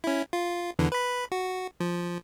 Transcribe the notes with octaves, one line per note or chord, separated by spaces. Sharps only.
C#4 E4
F4
E2 D3 E3
B4 B5
F#4
F3